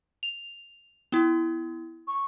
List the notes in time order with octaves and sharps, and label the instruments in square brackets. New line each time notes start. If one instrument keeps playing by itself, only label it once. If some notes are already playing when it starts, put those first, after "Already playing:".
[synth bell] F7
B3 E4
[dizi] C#6